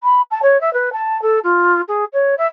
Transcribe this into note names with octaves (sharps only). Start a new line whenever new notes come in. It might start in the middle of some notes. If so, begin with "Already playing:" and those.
B5
A5
C#5
E5
B4
A5
A4
F4
G#4
C#5
E5